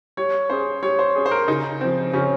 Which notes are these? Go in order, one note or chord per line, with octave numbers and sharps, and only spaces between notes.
G3 C#5
C#4 G#4 C5
G3 C#5
C5
C#4 G#4
C5
A#4
C#3 D#4
F3 C4
C#3 C#4